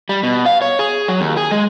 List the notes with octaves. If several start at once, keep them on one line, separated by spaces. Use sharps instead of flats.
G3
B2
F5
C#5
G#4
F#3
D#2
G#4
G#3